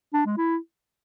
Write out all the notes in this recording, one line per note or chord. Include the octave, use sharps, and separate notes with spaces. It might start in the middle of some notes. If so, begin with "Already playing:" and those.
D4
G#3
E4